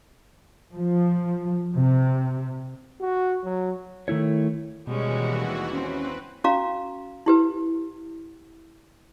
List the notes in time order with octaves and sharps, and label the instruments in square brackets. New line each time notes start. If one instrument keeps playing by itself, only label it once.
[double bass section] F3
C3
[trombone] F#4
F#3
[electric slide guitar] D#3 A3 E4 C#5
[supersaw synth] D#2 E3 F#4 [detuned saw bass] B2 [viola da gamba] G3 G#3 C#4
[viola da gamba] C4 [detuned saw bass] C#4 [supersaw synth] B4
[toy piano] C#4 F#4 F5 A#5
E4 G4 B4